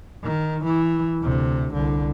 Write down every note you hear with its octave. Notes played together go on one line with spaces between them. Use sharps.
D#3
E3
D2 C3
C2 D3